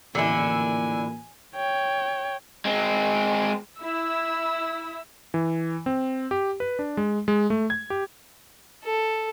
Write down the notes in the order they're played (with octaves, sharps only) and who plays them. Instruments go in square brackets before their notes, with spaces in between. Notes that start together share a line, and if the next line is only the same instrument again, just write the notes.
[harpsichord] A1 F2 A#2 [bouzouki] D3 E4 [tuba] A#3 [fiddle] G#5
[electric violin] C#5 G5
[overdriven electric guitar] G#3 C4
[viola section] E4 [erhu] E6
[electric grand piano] E3
C4
G4
B4
D4
G#3
G#3
A3
G#6
G4
[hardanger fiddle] A4